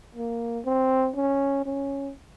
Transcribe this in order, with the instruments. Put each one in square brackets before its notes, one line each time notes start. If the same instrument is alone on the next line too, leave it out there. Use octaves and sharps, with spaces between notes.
[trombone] A#3
C4
C#4
C#4